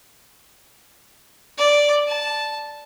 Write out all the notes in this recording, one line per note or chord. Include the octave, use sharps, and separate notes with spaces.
D5
A5